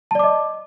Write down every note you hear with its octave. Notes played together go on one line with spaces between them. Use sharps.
D5 D#5 A5 D6